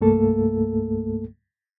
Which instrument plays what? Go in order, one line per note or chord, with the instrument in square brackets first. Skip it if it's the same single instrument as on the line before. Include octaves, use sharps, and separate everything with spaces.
[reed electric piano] C2 G2 A3 A#3 A4